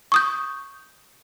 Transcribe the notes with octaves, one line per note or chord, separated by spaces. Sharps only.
C#6 D#6 G6